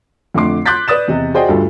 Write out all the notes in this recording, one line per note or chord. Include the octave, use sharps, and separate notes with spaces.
F2 D3 A3 C6 D6 C7
C6 D6 F#6 G6 A6 B6
B4 D5 D#6 A6 E7
E2 C3 D#5
F#4 G#4 C5 D5 D#5 G5
D2 G2 F4 A4